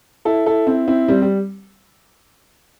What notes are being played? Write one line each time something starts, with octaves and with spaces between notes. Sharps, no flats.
E4 A4
E4 A4
C4 E4
C4 E4
G3 C4
G3